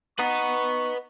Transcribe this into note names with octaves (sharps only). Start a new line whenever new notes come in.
B3 D#4 B4 F#5 C#6